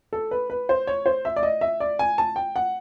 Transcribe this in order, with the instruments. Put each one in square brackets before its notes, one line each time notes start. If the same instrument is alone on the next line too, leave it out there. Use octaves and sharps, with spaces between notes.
[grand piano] A4
B4
B4
C5
C#5
C5
E5
D5
D#5
E5
D5
G#5
A5
G5
F#5